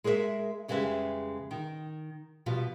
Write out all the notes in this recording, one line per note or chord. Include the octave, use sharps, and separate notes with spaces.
G#3 G#4 A#4 C#5 E5
F2 C#3 G3 G#3 B4 E5
D#3
B2 F3 G3 F4